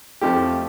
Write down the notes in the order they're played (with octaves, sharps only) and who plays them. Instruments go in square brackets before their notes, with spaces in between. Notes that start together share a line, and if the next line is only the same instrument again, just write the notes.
[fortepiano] F2 F3 A3 G4